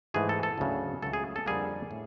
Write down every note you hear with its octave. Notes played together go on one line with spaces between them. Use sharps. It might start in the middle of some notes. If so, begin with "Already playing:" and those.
G#2 E3 A3 G#4
A4
A4
D2 C#3 F#3
C#2 C#3 F#3 A3 A4
G#4
A4
F2 D3 G3 A#3 G#4
A2